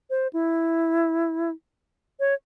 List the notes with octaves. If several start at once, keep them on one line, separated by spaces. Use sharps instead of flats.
C5
E4
C#5